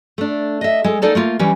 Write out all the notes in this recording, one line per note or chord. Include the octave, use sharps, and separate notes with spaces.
A3 D4
D#5 E5
G#3 A4
A#3 D#4 A4 D5 A5
A3 A#3 F4
E3 G3 C#4